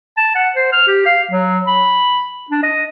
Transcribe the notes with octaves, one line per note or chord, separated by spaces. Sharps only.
A5
F#5
C5
F6
G4
F5
F#3
B5
D4
D#5